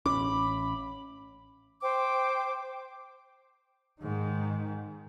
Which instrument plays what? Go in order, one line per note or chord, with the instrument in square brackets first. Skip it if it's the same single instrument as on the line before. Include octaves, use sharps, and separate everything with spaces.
[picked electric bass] A1 C#4 [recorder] B5 [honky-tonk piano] D6
[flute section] C5 G5 D6
[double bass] G#2 D#3